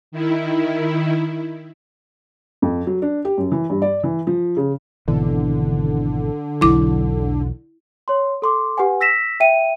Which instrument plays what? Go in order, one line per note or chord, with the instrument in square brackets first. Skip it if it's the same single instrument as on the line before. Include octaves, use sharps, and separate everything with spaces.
[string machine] D#3 E4
[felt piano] F2
F#3
D4
G4
F#2
E3
G2
D5
E3
F3
C#3
[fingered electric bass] G#1 B2 E3 [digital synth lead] D3
[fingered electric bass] B1 E2 F#3 [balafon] E4 D6
[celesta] C#5 C6
A4 C6 D6
G4 B4 F#5 G#5
E6 A#6 B6 E7
E5 G5 D#7